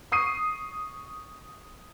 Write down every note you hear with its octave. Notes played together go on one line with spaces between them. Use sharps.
C#6 D#6 C7 D#7